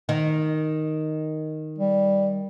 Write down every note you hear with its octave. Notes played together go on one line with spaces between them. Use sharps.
D#3
G3